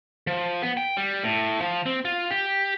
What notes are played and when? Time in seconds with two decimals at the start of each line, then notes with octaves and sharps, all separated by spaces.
0.27 F3
0.62 B3
0.77 G5
0.97 G3
1.23 A2
1.61 F3
1.86 C4
2.05 F4
2.31 G4